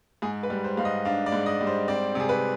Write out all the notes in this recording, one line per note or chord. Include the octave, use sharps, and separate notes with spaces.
G#2 G#4
B4
G3
C5
G#2 F5
D#5
D4 F5
D5
G#2
D#5
G3
C5
C4 D5
C3 G#4
B4